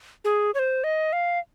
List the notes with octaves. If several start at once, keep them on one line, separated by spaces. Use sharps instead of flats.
G#4
C#5
C5
D#5
F5